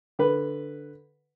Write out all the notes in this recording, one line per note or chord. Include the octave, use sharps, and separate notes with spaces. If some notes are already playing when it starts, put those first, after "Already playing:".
D3 B4